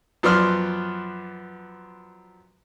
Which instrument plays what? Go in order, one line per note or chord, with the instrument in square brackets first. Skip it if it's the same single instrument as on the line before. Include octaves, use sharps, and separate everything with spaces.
[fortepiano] F#2 F3 B3 D5 C6 F6